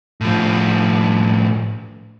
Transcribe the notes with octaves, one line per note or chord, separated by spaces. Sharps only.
A2 F3